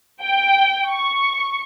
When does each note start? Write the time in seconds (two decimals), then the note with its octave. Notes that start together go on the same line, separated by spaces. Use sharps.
0.21 G5
0.88 C#6